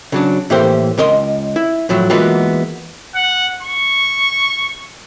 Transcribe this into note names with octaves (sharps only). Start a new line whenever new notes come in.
C#3 F#3 D4
A2 E3 A#3 G4 C5
C#2 A#4 D#5 C6
E4
A2 F3 F#3 E4
E3 G#3 A#3 B3 F4 F#4
F#5
C#6